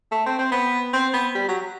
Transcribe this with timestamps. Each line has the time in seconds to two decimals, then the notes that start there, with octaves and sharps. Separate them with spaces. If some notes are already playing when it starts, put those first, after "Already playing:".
0.11 A3
0.26 C4
0.39 C4
0.52 B3
0.93 C4
1.13 B3
1.35 G3
1.48 F#3